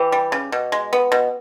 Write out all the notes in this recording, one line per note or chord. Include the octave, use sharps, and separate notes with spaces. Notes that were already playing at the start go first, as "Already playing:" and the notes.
Already playing: E3 G4
G3
C#3
B2
G#3
B3
B2